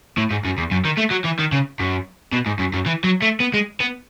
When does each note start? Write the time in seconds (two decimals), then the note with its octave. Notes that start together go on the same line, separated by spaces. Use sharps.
0.17 A2
0.31 G#2
0.45 F#2
0.58 E2
0.71 F#2
0.85 D#3
0.98 A3
1.11 F#3
1.25 E3
1.39 D#3
1.52 C#3
1.80 F#2
2.32 B2
2.46 G#2
2.59 F#2
2.73 F#2
2.86 E3
3.04 F#3
3.22 A3
3.40 B3
3.54 G#3
3.80 B3